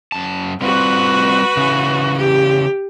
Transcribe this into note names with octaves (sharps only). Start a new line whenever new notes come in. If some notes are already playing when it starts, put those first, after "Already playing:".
F#2 A5
G3 C4 F4 F#4 B4
C#3 E3
G4